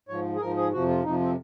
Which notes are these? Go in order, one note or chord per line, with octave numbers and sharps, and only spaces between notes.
G#2 F3 C#5
G#4
G#2 F3 A#4
G#4
F2 C3 F3 F#4
F4
F2 C3 F3 D#4
C4